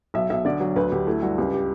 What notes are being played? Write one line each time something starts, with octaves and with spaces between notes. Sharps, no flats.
B1 E5
B1 E5
D3 D5
F#3
D2 B4
D2 G4
A3 E4
G2 F#4
C#2 G4
G4